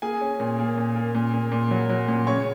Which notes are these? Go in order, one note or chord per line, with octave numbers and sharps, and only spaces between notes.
A#3 G#4 G#5
C#4
A#2
A#3
A#2
A#3
A#2
A#2
A#2
F#3
F#3
A#2
C#3 C#5 C#6